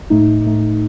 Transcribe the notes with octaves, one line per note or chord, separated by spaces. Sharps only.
A2 A3 D#4
A2 A3 D#4